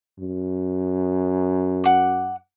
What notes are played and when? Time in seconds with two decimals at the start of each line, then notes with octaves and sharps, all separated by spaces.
0.20 F#2
1.84 F#5 D6